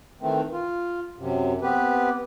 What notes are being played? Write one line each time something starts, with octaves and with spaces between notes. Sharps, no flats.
D#3 E3 A3 C4
F4
F#2 C3
B3 C4 G4 B4